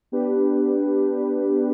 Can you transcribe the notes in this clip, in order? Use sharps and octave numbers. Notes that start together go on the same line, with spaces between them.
B3 D4 G4 B4